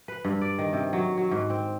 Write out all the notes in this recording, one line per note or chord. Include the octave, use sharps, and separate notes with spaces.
B4
G2
D5
D#3
C3
F#3
F#3
G#2
C4